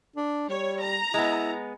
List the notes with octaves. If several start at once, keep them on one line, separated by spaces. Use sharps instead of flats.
D4
G3 C#5
A#5
G#3 B3 E4